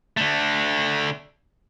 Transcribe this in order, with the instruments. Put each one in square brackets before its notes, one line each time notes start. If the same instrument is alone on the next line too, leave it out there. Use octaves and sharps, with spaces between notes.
[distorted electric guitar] D3 A3